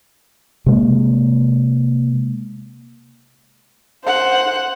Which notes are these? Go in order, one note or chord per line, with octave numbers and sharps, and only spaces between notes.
C3 G#3 A#3
C5 F#5